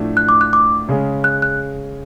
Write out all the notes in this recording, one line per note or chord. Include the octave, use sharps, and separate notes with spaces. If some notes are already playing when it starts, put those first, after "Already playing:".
Already playing: A2 F3 A3 D4
F#6
D6
F#6
D6
C#3 G#3 C#4
F#6
F#6